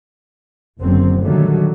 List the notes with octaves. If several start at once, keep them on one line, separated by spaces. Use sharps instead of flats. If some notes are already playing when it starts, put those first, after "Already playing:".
F#1 F#2 D3 F#3 C4
A#2 D3 D#3 F#3 G3 A3